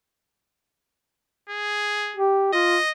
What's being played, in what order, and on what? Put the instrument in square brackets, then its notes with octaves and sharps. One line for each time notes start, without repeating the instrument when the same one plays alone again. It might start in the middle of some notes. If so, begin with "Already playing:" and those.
[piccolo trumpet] G#4
[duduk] G4
[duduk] F4 [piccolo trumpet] D#5